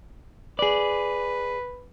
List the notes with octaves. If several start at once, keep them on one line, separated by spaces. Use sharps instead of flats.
G#4 B4 D5